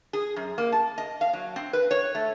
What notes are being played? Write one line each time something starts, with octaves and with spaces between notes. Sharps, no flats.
G#4
F#2
A#3
A5
D#5
F5
F#3
C4
B4
C#5
A3